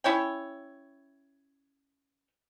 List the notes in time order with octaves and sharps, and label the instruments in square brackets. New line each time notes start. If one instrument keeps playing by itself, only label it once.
[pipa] C#4 E4 C#5 G5